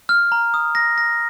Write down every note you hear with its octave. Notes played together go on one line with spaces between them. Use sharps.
F6
A#5
D#6
A#6
A#6